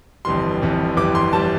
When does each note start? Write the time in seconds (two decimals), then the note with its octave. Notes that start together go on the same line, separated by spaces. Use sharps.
0.25 G1 F2 E3 G3 C6
0.62 G1 F2 E3 G3
0.97 G1 F2 E3 G3 D6
1.15 C6
1.33 E3 G3 A5